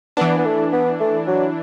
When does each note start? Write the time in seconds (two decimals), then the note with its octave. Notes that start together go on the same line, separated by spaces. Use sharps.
0.17 E3 B3 D4
0.38 B3
0.45 A3
0.72 B3
1.00 A3
1.27 F#3